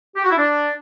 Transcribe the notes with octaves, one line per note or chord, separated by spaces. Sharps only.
G4
F#4
E4
D4